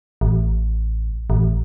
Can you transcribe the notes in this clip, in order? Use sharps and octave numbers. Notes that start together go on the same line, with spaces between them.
A1
A1